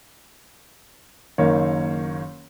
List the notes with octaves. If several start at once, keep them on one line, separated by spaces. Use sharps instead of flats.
F#1 D#3 A#3 C#5